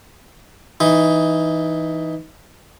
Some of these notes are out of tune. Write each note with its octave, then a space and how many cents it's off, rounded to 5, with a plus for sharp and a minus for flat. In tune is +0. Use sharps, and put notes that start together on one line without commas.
E3 +0 D#4 +10